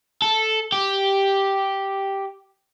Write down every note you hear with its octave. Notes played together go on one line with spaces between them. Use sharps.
A4
G4